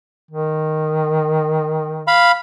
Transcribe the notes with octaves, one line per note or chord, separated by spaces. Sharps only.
D#3
F5 B5